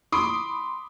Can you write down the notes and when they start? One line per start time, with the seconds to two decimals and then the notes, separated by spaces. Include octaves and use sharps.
0.12 B5 C6 D6 D#6